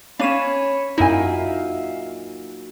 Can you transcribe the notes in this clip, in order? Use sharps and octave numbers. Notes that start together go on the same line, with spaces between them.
C#4 D4 C#5 F5 B5 D#7 E7
F#2 A#2 F#3 D#4 E4 E5 F5 G#5